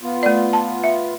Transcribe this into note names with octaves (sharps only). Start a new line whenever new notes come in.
B3 F4
A3 D5
A5
E5